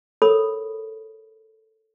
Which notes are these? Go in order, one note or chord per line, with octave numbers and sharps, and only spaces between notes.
A4 A#4 C#5 B5 D#6